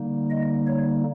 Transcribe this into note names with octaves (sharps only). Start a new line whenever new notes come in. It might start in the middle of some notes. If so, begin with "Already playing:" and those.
Already playing: D3 G3 A#3 D#4
D#5
C#5